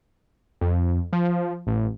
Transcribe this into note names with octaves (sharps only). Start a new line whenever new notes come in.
F2
F3
A1